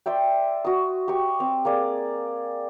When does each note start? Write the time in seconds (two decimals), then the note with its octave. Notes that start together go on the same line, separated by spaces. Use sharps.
0.06 C5 D5 E5 G5
0.65 F#4 D#6
1.08 G4 C#6
1.40 C4
1.65 A#3 G#4 D5